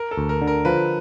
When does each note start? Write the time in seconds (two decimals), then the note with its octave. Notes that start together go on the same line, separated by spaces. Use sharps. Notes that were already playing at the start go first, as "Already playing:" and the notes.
Already playing: A#4
0.11 A4
0.17 D2
0.29 A#4
0.42 D3
0.47 A#4
0.65 F3 B4